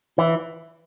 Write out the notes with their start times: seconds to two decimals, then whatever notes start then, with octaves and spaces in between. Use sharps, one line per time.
0.18 E3